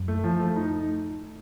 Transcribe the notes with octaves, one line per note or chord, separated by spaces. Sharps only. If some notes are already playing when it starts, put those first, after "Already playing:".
Already playing: F#2
A3
F3
A3
D#4